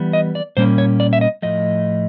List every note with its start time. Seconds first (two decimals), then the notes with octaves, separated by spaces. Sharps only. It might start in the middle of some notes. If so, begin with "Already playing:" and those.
Already playing: E3 G3 B3
0.13 D#5
0.35 D5
0.57 A#2 G3 A#3 C#4 C5
0.78 C#5
1.00 D5
1.13 E5
1.21 D#5
1.42 A2 F3 A3 D#5